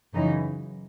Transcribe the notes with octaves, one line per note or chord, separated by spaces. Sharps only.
F#2 C#3 E3 D#4